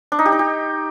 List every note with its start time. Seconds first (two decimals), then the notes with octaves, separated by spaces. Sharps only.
0.12 D4
0.19 D#4
0.26 G4
0.32 D#4
0.39 G4